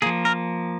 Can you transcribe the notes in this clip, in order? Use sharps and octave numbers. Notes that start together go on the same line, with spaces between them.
F3 A#3 G#4
A#4